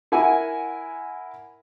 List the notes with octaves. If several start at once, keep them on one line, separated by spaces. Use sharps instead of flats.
E4 A#4 F#5 G#5